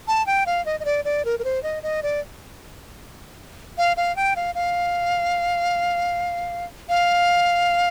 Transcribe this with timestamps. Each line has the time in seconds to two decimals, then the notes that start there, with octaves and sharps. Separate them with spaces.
0.08 A5
0.26 G5
0.46 F5
0.66 D#5
0.80 D#5
0.85 D5
1.05 D5
1.25 A#4
1.39 A#4
1.44 C5
1.63 D#5
1.83 D#5
2.03 D5
3.78 F5
3.97 F5
4.16 G5
4.36 F5
4.55 F5
6.89 F5